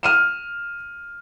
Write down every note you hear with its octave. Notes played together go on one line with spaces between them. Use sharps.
F6 D#7 E7